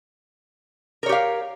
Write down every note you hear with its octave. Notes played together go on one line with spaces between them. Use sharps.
G4 A#4 C#5 F5